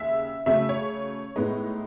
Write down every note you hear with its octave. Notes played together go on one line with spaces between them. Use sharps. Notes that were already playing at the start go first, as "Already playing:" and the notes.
Already playing: D#2 C#3 G#3 E5
C#3 F#3 A3 E5
C#5
A2 G#3 B3 D#4